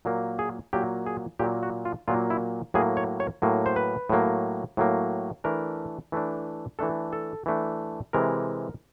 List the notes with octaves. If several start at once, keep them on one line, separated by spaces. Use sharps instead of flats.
A#2 F#3 A#3
G#4
A#2 F#3 A#3 G4
G#4
A#2 F#3 A#3 G4
F#4
F4
A#2 F#3 A#3 F4
E4
A2 F#3 A#3 G#4
C#5
C#5
A2 F#3 A#3
C5
B4
A2 F#3 A#3
A2 F#3 A#3
E3 A3 D4 A#4
E3 A3 D4
E3 A3 D4 A4
A4
E3 A3 D4
C3 E3 G#3 A#4